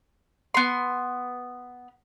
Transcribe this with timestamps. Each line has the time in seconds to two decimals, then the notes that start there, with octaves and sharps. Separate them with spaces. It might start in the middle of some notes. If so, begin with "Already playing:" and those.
0.54 B3 C6